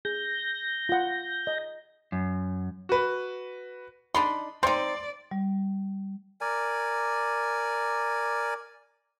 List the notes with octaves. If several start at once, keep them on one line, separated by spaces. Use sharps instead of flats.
G#4 G6 A#6
F4 F#5
D#5
F#2
F#4 B4
D4 D#4 B5 C6
C4 D#4 D5 C6
G3
A#4 D5 G#5